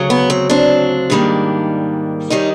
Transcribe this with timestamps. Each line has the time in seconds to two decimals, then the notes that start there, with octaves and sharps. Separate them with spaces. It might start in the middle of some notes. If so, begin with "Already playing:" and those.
Already playing: D2 C#3 F#3
0.10 B3
0.30 C4
0.50 C4 D4
1.10 G#2 D#3 G3 A#3
2.30 D#3 G3 C#4 D#4